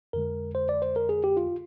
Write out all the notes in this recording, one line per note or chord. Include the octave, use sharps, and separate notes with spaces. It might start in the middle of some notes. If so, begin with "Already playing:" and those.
F2 D3 G#3 A#4
C5
D5
C5
A#4
G#4
G4
F4